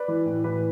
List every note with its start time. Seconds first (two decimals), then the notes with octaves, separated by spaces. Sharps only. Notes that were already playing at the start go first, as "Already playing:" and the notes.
Already playing: B4 D5
0.08 E3
0.26 A2
0.44 E3 B4